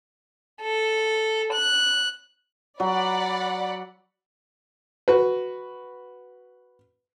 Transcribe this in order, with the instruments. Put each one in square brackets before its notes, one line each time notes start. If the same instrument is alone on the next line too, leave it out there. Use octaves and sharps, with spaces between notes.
[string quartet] A4
F#6
[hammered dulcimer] F#3 [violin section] D5 F#5 B5
[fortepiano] F#4 B4